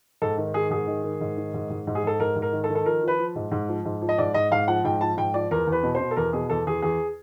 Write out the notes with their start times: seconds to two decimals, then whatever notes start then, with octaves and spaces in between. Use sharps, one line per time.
0.22 G#2 A4
0.38 D#3
0.54 D#3 G#4
0.70 G#2 G#4
0.87 D#3
1.03 D#3
1.21 G#2
1.37 D#3
1.54 G#2
1.70 G#2
1.87 G#2
1.95 G#4
2.04 G#2 A4
2.20 G#2 A#4
2.36 G#2
2.42 A#4
2.53 D#3
2.64 A4
2.70 D#3
2.75 A4
2.86 F3 A#4
3.03 F3 B4
3.19 F3
3.36 G#2
3.52 G#2
3.68 F3
3.85 G#2
4.02 F3
4.09 D#5
4.18 G#2 D5
4.34 G#2 D#5
4.51 G#2 F5
4.68 F3 F#5
4.84 G#2 G5
5.01 F3 A5
5.17 G#2 G5
5.34 F3 D5
5.51 E2 A#4
5.67 E2
5.72 B4
5.83 B2
5.95 C5
6.00 B2
6.11 A4
6.16 E2 A#4
6.33 B2 G#4
6.50 E2 A4
6.67 E2 G#4
6.82 E2 G#4